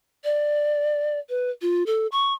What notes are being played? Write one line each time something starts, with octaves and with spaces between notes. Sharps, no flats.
D5
B4
F4
A4
C#6